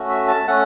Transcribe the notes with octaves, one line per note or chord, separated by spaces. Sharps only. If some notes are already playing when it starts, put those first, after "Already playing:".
Already playing: A3 C#4 F#4
E5
A5
A3 C#4 F#5